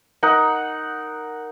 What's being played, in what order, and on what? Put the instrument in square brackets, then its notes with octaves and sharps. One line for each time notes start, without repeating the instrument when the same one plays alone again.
[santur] D#4 A#4 F#5